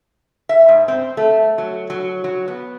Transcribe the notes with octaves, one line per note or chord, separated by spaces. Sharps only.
E5
G#2
C4
A3
F#3
F#3
F#3
B3